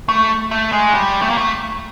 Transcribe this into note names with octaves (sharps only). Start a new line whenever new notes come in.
A3 C#6
A3
G#3
G3
A3
A#3
A3